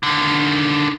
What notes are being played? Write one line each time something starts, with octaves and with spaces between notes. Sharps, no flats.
D3 D#3